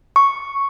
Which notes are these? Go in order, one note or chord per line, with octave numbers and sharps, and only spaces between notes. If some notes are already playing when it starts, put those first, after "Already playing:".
C#6